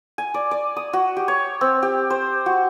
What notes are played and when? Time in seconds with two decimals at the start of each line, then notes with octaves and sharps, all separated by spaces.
0.18 G#5
0.34 D5
0.51 D5
0.76 D#6
0.93 F#4
1.17 G4
1.28 C#5
1.61 C4
1.83 G4
2.10 C5
2.46 F#4